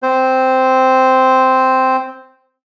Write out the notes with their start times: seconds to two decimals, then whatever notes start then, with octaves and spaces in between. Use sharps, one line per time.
0.03 C4 C5